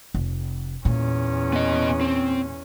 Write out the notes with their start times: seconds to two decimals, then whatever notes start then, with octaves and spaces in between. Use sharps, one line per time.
0.14 F1
0.85 E2 A#2 C#4
1.53 B3 D#5
2.01 C4